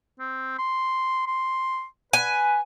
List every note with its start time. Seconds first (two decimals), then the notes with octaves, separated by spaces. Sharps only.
0.20 C4
0.59 C6
1.27 C6
2.13 B4 G#5